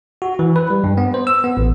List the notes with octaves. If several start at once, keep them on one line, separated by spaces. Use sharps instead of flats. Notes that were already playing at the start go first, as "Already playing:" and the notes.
F#4
E3
B4
G3
G2
B3
C5
E6
B3
A1